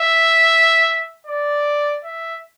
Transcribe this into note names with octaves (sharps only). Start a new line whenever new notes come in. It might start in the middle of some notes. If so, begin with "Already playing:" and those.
Already playing: E5
D5
E5